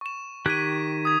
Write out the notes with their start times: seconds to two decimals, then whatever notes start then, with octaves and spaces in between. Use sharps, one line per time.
0.01 C#6 E7
0.46 D#3 G4 F#6 G#6 B6 D#7
1.05 D#6 G#6